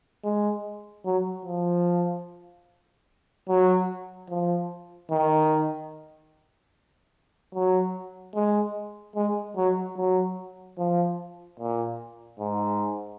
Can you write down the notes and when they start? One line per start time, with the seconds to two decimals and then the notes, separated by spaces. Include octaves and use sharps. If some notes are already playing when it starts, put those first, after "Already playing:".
0.24 G#3
1.05 F#3
1.45 F3
3.48 F#3
4.29 F3
5.11 D#3
7.54 F#3
8.35 G#3
9.16 G#3
9.56 F#3
9.96 F#3
10.78 F3
11.60 A#2
12.39 G#2